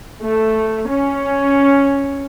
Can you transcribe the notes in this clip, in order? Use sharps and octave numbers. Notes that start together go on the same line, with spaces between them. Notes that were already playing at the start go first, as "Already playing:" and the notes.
A3
C#4